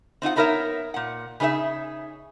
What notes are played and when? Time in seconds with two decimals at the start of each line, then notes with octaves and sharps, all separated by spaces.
0.22 C4 D#4 F4 F#5
0.36 A3 B3 D#4 A#4 C#5 E5
0.94 A#2 F#5
1.40 C#3 D#4 G#4 C5 E5